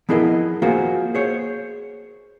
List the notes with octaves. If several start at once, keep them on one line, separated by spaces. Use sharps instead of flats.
F3 B3 E4 G#4 A#4 D#5
A#3 F4 F#4 G#4 A#4 C5
G#4 C5 C#5